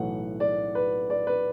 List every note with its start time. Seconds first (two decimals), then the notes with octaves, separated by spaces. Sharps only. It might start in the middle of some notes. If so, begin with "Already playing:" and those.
Already playing: B1 A2 E3 A3 F#5
0.40 D5
0.75 B4
1.10 D5
1.27 B4